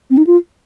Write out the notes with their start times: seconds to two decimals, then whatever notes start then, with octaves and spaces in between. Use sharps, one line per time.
0.10 C4
0.18 D#4
0.27 F4